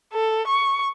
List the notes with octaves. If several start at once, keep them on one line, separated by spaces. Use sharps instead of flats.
A4
C#6